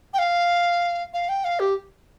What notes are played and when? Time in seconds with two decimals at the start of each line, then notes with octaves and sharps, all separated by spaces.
0.14 G5
0.18 F5
1.13 F5
1.29 G5
1.44 F5
1.60 G4